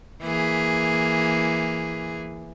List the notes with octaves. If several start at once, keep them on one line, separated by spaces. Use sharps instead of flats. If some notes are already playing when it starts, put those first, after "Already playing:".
E3 A#3 G#4